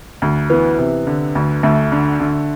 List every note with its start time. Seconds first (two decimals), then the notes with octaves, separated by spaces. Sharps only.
0.22 D2
0.50 E3 B3
0.78 C3
1.07 D3
1.35 D2
1.63 D2 A3
1.92 D3
2.20 D3